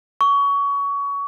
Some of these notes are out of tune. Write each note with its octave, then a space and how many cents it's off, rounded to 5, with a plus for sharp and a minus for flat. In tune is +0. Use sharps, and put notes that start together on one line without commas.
C#6 +25